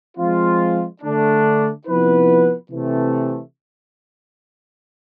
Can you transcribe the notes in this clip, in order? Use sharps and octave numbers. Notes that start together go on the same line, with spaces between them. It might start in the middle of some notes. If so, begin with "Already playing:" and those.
F3 G#3 C4 F4
D3 A3 D4
C3 F3 B3 E4 B4
C3 E3 A3